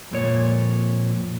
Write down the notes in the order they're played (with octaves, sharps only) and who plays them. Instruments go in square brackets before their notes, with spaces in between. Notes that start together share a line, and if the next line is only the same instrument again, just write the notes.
[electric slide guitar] F2 A#2 C#5